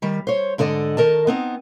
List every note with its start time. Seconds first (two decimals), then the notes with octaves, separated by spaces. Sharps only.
0.02 D#3 G3
0.27 C5 C#5
0.58 G#2 D3 A4 D5 D#5
0.97 D#3 A#4 D#5 A5
1.27 B3 C4 D#4